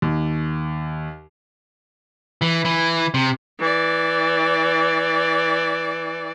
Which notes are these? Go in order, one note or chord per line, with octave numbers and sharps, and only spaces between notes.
D#2
E3
E3
C3
E3 D5